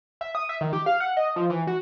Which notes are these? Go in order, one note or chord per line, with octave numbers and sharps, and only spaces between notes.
E5
D#6
E5
D#3
G4
F5
F#5
D#5
F3
E3
F#4